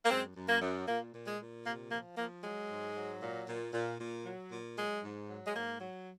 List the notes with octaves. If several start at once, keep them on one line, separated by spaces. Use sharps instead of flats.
A#3
F#2 G#3 C4
F#2
A#3
F#2
A#2 A#3
A#2
G#3
A#2
C3 A#3
F3 A#3
F3 A#3
F#3 G#3
G#2
F#3
A#2
A#2
A#2
A#2
F#3
A#2
F#3 G#3
G#2
F#3
G#3
G#2 A#3
F#3